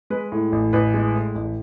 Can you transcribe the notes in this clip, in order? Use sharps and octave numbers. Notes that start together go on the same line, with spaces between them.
G#3 B4
A2
A1
A1 B4
G#3
A2
A1